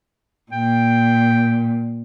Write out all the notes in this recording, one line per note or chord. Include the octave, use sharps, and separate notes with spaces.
A#2 G5